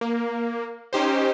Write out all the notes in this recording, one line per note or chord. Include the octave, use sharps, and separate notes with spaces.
A#3
C#4 D#4 G4 C5